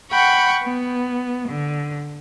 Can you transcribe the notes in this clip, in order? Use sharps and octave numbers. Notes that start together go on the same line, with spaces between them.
F#5 G5 B5 C#6
B3
D3